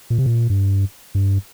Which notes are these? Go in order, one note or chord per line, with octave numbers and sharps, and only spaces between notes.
A#2
C3
A#2
G2
G2